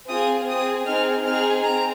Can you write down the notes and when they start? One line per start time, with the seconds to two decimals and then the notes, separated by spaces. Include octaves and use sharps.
0.09 C4 F4 G#4 D#6
0.47 C4 G#4 D#6
0.86 C4 D#4 G#4 F6
1.25 C4 D#4 G#4 F6
1.64 C4 A#5